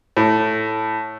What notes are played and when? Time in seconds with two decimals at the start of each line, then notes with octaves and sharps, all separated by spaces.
0.17 A2